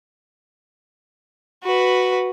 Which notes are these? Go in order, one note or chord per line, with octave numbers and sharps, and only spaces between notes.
F#4 B4